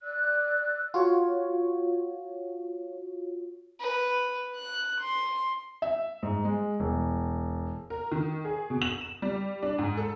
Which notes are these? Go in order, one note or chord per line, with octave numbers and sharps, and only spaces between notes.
D5 E6 F#6
F4 F#4 C#5
B4
F#6
C6
E5
G#2
G#3
E1
A#4
D#3
G#4
B2
F#7
E7
G3
D4
G#2
A4